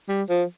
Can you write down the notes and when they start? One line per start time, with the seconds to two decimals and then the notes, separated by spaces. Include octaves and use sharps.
0.08 G3
0.29 F3